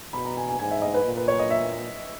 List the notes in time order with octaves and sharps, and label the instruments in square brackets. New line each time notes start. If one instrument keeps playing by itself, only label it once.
[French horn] B2 [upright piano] B5
[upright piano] A#5
G#5
G#5
[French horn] G#2 [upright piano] G#5
[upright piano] E5
D#5
B4
[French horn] A#2
[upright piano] B4
C#5
D#5
E5